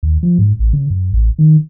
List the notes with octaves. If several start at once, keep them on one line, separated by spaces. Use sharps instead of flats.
D#2
F3
G#2
A1
C#3
F#2
A1
D#3